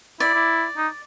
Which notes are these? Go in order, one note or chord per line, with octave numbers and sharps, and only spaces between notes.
E4 D5
E4
D#4